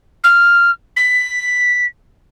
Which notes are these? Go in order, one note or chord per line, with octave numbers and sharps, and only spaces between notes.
F6
B6